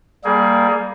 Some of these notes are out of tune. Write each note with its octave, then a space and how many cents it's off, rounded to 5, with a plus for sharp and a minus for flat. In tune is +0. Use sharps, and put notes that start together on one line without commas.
G3 +0 A#3 +0 G#4 +25